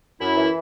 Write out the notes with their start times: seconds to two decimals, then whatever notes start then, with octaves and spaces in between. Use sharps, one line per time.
0.20 F#2 E4
0.36 E3